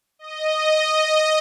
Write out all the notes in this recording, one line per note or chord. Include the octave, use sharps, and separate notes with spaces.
D#5